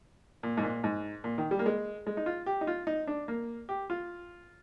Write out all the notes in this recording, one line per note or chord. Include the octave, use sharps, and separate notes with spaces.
A#2
G#2
A#2
G#2
A#2
D#3
G3
A#3
G#3
G#3
D#4
F4
G4
D#4
F4
D#4
D4
A#3
G4
F4